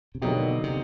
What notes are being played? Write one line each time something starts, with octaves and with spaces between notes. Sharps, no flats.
C3
B2 D3 F#3 A#3 D#4 G4
C3